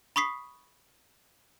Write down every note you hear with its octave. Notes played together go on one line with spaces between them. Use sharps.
B5 C#6 D#6 B6 C7